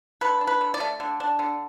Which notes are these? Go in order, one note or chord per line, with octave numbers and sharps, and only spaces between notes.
D3 B4
D4
B4
D3
D5
A3
D3
D4
D3